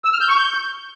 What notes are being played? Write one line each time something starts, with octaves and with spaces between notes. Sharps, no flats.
E6
F6
G6
C#6
G6